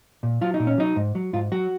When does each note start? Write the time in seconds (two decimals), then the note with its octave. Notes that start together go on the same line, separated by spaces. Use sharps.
0.23 A#2
0.41 F#3 F4
0.54 D#4
0.60 A#2
0.67 C#4
0.78 F#3 D#4
0.96 G#2
1.15 F#3
1.33 G#2 F4
1.52 F#3 F#4